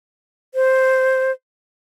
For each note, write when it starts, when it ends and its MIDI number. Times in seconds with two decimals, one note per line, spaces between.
0.55 1.32 72